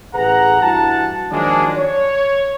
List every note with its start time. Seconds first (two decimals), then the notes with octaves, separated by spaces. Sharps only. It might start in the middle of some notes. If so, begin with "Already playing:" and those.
0.15 A1 G#4 B4 F#5 A#5
0.62 G2 E3 F#4 F#5 A5
1.32 D#3 F3 F#3 G#3 A#3 D4
1.78 C#5